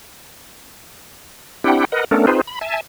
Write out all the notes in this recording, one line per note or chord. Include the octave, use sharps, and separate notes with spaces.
C4 D4 E4 G4 F#5 G5
A#4 B4 D#5 F#5
A3 B3 C#4 D4 A4 A#4
C4 D#4 F4 G#4 B4 C5
B5
E5 G#5 A5